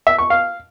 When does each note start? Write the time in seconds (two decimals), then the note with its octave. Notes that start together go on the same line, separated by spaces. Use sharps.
0.07 E5
0.18 C#6
0.30 F5